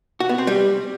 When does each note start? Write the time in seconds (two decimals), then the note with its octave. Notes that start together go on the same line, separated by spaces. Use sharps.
0.20 F#4
0.29 B3
0.38 C4
0.47 G3